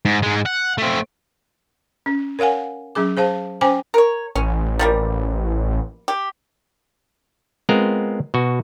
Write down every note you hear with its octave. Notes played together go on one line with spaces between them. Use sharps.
G#2
G#2 G#3
F#5
A3 C4
C#4
A#4 C#5 F5 F#5 G#5
F#3 C#4 G#4 D6
G#4 C5 F5 A5
C#4 C5 G5 G#5 D6
A#4 C#5
A1 C#4
F3 G3 A#3
G4
G#3 B3 C4 F4 A#4
B2 F#4